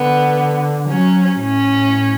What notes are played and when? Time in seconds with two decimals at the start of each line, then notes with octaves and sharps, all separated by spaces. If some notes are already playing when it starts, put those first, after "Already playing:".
Already playing: D3 B3
0.89 F#3 C#4
1.42 A2 C#4